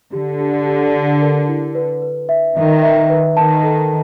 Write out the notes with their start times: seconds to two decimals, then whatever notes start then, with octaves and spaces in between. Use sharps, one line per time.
0.13 D3 G4
0.40 G4
0.67 G4
0.94 G4
1.21 A#4
1.48 E4
1.75 B4
2.02 B4
2.29 E5
2.56 D#3 E5
2.83 E5
3.10 B4
3.37 D#3 A5
3.63 A4